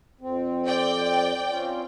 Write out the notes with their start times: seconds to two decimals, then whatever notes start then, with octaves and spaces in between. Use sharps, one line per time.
0.21 F2 C4
0.67 D5 G5
1.50 C4 C#4 F4